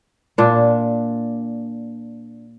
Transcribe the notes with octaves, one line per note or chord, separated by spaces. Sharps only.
A#2 D4